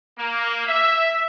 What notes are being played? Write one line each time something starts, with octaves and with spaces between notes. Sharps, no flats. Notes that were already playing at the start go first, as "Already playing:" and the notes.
A#3
E5